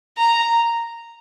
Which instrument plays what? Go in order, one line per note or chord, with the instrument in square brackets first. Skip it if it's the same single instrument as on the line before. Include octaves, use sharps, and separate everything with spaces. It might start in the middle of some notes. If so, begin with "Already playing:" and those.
[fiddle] A#5